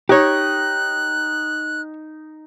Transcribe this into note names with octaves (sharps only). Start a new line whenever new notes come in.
D#4 G4 C#5 F#6